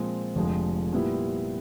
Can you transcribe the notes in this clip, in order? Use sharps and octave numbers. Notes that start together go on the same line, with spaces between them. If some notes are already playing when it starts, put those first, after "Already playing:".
Already playing: A#2 F3 G#3 C4
F1 F2 D3 F3 G#3
A#2 G3 B3 E4